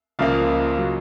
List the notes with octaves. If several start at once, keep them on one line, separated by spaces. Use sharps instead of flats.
C#2 C#3 F3 A#3 F5
C#3 F#3